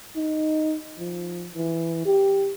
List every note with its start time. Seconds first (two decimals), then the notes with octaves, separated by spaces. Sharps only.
0.16 D#4
0.98 F3
1.55 E3
2.06 G4